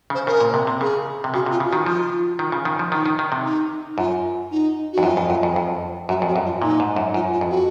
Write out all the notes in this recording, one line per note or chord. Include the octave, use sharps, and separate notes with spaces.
C#3 C5
C#3 A#4
A#2
C3
C3
C#3 G#4
C3
C#3 F#4
C3 F4
C#3
F#4
D#3
F3 F4
D#3
C#3
D#3
F3
D#3 D#4
D#3
D#3
C3
D#4
F#2 F4
D#4
F2 F#4
F#2 F4
F2
F#2
F2
F2
F#2 F#4
F2
F#4
F#2
F4
A#2 D#4
G#2
F#2
F#2 F4
F4
F2
F#4